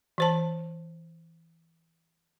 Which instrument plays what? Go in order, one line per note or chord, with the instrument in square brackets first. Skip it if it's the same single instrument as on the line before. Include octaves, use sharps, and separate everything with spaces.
[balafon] E3 C5 A5